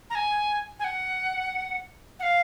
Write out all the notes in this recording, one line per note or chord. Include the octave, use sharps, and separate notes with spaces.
A#5
G#5
G#5
F#5
F#5
F5